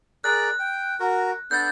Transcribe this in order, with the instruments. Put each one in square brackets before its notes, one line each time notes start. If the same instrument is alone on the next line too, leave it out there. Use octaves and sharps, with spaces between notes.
[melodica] G#4 A#4 D5 [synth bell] F#6
[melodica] G5
F#4 A#4
[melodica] B3 D4 A4 [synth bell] G6 A6